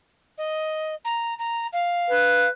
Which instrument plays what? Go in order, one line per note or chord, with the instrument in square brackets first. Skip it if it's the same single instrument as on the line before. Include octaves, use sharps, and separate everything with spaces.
[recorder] D#5
A#5
A#5
F5
[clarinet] B4